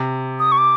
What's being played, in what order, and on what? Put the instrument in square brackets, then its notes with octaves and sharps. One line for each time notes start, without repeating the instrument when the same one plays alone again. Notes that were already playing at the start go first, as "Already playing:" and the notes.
Already playing: [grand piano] C3
[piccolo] D#6
C#6
D6